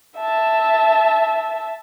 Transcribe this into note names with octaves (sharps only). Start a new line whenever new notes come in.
E5 A5